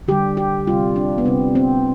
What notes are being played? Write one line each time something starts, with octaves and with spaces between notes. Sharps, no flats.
D3 G3 G4
G4
C3 G3 F4
D4
B3
C3 G3 C4
C4